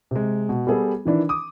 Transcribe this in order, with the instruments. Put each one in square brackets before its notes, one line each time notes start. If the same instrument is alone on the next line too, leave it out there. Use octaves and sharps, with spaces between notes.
[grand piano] C3 G#3
B2
G3 B3 G#4 A4
D#3 E3 D4 E4
D6 D#6